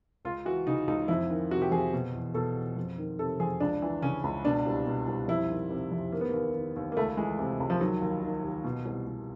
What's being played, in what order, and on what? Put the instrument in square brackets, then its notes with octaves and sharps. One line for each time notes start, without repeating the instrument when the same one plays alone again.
[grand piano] C#2 F4
E3 F#4
C#3 D#4
C#2 D#4
F2 E4
D#3
C3 F#4
G4
F2 G#4
B2
E2
B2 A4
E2
F2
D#3
C3 A4
F2 G#4
C#2 D4
E3
C#3 C#4
C#2
B2 D4
C2
B2
C2
F2 E4
D#3
C3
F2
D#3 A#3
B3
D#2 A#3
D#3
D#2
A#3
C#2 A3
E3 G#3
C3
C#2
F3
D#3 F#3
D#2
D#3
D#2
B2
C2
B2